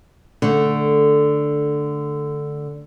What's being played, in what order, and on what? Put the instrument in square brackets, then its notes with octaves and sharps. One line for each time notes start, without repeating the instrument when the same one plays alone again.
[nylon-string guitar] D3 A3